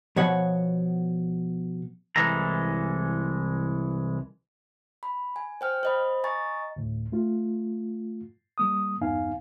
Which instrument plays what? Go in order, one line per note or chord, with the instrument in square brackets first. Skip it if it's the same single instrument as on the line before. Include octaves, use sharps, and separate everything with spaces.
[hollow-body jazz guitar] B2 F3 C#5 F#5
[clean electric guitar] C2 E3 G#3 A4 A#5
[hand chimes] B5
G#5
C5 G5 F6
C5 D#5 B5
D#5 G#5 A#5 C#6 A6
[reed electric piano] D2 A2
A3 F4
G3 A#3 D#6
E2 G2 B3 D#4 F5 G#5